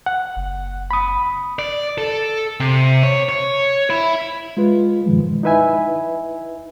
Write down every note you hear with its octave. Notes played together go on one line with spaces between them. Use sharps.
F#5
F#1
B5 D#6
D5
A4
C3
C#5
C#5
E4
G#3 F4 B4
G2 B2 D#3 F3 G#3
D#4 E4 B4 E5 G#5